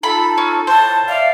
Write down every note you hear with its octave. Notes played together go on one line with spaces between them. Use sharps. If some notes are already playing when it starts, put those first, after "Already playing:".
D#4 F4 A4 B5
C#4
A2 C5 A5
D5 E5 F5